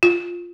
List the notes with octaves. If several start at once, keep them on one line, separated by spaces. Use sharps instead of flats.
F4